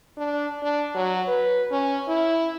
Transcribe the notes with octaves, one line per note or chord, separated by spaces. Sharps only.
D4
D4
F#3
B4
C#4
E4